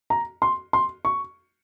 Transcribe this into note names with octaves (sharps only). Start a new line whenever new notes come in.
A#5
C6
C6
C#6